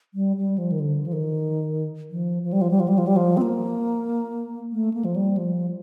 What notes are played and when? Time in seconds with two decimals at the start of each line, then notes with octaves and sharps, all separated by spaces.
0.14 G3
0.37 G3
0.58 F3
0.72 D#3
0.80 D3
1.06 F3
1.13 D#3
2.11 F3
2.43 F3
2.53 G3
2.61 F3
2.71 G3
2.80 F3
2.88 G3
2.98 F3
3.07 G3
3.16 F3
3.37 C4
3.42 A#3
4.73 A3
4.94 A#3
5.05 F3
5.16 G3
5.37 F3